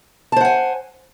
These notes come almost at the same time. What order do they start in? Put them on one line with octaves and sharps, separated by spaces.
A5 C5 F#5 G#5